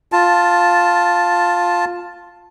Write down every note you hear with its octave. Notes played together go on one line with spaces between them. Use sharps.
F4 A5